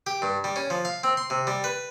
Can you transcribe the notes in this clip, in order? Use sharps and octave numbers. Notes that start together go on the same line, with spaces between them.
G4
G2
G3
C#4
F3
F5
C4
C6
C3
G3
B4